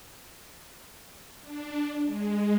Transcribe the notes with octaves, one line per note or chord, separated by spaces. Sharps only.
D4
G#3